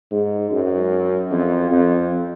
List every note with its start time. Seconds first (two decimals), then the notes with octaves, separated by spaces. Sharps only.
0.11 G#2
0.51 F#2
1.31 F2
1.71 F2